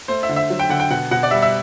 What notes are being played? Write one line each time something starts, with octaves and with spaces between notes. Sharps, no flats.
A3 C5
E5
D3
E5
F#3
G5
D3 F#5
G5
B2 F#5
B2 F#5
D5
G3 E5
E5